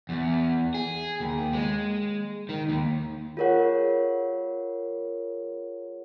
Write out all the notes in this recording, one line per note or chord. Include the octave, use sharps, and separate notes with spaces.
E2
G#4
D#2
G#3
D#3
D#2
F4 G#4 A#4 C#5 F#5